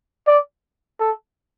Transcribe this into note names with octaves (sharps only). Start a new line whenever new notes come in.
D5
A4